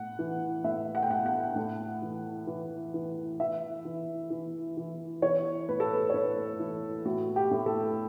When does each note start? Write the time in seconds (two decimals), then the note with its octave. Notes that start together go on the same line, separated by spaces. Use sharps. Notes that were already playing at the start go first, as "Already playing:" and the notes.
Already playing: A2 F#5
0.19 E3
0.64 A2 E5
0.95 F#5
1.03 G5
1.10 A2 F#5
1.26 F#5
1.56 A2
2.02 E3
2.47 E3
2.94 E3
3.40 E3 E5
3.85 E3
4.30 E3
4.77 E3
5.22 E3 C#5
5.69 A2 B4
5.80 A4
5.92 B4
6.10 C#5
6.14 A2 B4
6.60 E3
7.05 A2 F#4
7.36 G4
7.51 A2
7.66 A4